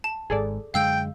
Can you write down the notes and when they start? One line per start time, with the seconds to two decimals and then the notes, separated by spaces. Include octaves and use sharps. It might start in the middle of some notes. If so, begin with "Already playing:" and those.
0.04 A5
0.30 G#1 G#2 G#4 A4 D5
0.74 F#2 D3 G#3 F5 G5 E6 G6